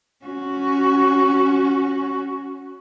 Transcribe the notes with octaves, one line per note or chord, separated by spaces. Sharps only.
C#4 F#4